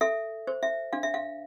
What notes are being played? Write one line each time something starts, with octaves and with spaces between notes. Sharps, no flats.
A4 E5
C5
E5
D4 F5
E5
F5